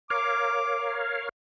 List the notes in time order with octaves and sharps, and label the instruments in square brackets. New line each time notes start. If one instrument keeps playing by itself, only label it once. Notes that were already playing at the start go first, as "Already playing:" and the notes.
[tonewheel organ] A#4 C#5 F5 [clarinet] D6